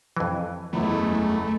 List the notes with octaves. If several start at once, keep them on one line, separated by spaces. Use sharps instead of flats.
F2 E3
F#1 E2 G#3 A3 E4 B5